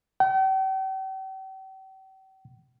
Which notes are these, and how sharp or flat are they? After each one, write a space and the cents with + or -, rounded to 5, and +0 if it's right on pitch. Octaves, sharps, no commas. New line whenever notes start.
G5 -45